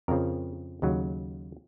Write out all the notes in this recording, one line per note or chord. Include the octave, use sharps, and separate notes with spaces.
F2 C#3 F3 A#4
D#2 C#3 F#3